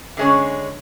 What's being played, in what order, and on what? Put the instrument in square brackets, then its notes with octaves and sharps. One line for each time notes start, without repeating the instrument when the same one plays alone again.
[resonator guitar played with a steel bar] D3 G#3 C#4